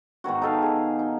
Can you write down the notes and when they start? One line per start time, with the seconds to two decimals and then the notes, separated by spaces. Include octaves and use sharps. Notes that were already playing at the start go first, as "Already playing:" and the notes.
0.24 G#2 B2 D#3 F#4
0.42 D#4 A4 F5
0.62 G#4
0.99 D#4